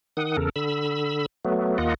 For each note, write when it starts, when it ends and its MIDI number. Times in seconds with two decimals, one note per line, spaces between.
0.17 0.37 51
0.17 0.37 78
0.17 0.37 87
0.37 0.50 40
0.37 0.50 49
0.37 0.50 69
0.37 0.50 70
0.56 1.26 50
0.56 1.26 83
0.56 1.26 88
1.45 1.78 54
1.45 1.78 57
1.45 1.78 59
1.78 1.94 39
1.78 1.94 58
1.78 1.94 65
1.78 1.94 75
1.78 1.94 78